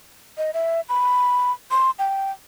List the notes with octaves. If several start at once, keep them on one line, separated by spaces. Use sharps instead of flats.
D#5
E5
B5
C6
G5